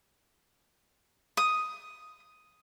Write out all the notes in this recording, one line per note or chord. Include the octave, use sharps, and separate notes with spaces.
D#6